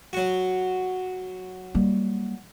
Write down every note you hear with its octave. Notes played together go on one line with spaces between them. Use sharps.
F#3 F#4
G3 A#3